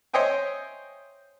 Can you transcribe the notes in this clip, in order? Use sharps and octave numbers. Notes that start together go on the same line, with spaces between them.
C5 C#5 D#5 E5 G5 G#5